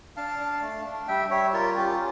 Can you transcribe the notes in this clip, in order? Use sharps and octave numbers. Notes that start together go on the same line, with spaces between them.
D4 F5 A5
D4
A3
D4
G3 E5 G5
G3 C#5 E5
F4 A#4 D5
C#4 G4